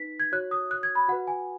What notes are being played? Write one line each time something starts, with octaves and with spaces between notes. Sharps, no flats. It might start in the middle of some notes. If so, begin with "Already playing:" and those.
Already playing: D#4 B4 B6
G#6
F#4 C#5 F#6
D#6
F#6
G#6
B5
F#4 B4 F#5
G#5